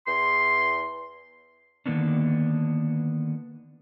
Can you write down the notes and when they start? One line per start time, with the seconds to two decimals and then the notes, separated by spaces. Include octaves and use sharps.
0.06 E2 C6
1.86 D3 D#3 A#3 B3 C#4 D4